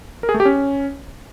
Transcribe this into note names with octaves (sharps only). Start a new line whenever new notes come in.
A#4
G#4
A3
G4
C#4